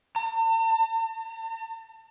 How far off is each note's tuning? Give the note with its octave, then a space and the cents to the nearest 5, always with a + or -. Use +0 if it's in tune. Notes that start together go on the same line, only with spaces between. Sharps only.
A5 +45